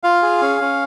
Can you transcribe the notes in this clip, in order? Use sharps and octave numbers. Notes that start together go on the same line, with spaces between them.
F4 F5
G#4
C#4
C#4